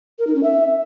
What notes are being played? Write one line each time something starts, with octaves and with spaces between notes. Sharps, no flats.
A#4
D#4
C#4
E5